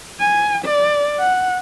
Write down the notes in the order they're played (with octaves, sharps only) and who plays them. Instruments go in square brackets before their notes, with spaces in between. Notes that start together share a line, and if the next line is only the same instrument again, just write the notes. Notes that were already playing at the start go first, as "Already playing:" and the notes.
[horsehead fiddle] G#5
D5
F#5